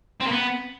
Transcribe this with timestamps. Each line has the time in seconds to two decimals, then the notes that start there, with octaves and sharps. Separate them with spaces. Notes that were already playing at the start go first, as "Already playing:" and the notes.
0.20 C4
0.26 A#3
0.31 B3